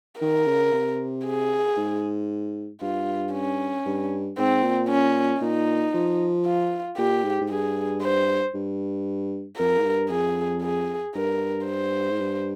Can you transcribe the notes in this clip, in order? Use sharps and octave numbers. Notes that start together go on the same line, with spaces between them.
D#3 A#4
C#3
C3
G#4
G#2
G2 F4
C#4
G2
G#2 C4
A#2
C#4
A#2 D#4
F3
F4
A#2 G4
G#2
G#2
G2 G#4
C5
G2
F2 A#4
G#2
G2
F2 G#4
G#4
G2 A#4
C5
G#2
G2